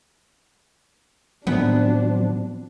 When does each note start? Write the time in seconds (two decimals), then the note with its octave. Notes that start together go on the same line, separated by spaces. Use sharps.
1.47 A2 D#3 F3 F#3 B3 C4 D4